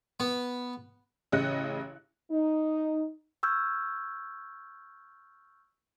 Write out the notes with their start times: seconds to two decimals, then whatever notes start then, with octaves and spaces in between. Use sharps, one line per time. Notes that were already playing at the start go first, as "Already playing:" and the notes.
0.20 B3
1.32 A1 C#3 D#5 F#6 C#7
2.31 D#4
3.43 C#6 E6 F6 G6 G#6